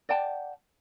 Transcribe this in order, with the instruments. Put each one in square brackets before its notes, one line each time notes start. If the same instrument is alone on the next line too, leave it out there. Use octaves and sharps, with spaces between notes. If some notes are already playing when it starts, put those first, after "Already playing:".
[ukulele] D5 F#5 G5 A5